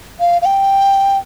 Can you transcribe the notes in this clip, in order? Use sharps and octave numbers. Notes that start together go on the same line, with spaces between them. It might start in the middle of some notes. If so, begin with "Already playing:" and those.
F5
F5
G5